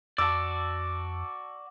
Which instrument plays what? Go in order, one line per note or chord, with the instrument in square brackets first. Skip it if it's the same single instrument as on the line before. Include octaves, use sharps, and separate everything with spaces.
[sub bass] F2 [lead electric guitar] F#4 D5 [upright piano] A5 E6 [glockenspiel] D6